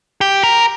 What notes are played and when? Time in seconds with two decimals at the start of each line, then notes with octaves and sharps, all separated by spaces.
0.21 G4
0.43 A#4